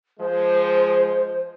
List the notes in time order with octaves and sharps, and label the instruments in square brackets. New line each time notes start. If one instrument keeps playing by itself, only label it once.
[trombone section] F3 G#3 [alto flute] C5